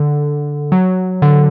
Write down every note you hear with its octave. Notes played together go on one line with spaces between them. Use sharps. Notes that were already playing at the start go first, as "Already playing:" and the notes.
Already playing: D3
F#3
D3